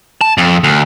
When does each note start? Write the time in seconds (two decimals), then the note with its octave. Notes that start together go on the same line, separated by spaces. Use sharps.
0.21 A5
0.38 F2
0.64 D2